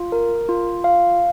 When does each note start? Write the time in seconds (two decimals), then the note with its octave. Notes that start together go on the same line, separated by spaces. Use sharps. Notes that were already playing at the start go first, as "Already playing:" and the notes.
Already playing: F4
0.12 A#4
0.49 F4
0.84 F5